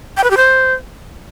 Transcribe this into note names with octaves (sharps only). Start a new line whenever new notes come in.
G5
B4
G4
C5